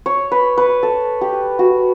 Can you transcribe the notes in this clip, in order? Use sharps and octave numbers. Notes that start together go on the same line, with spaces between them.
C#5
B4
B4
A4
G4
F#4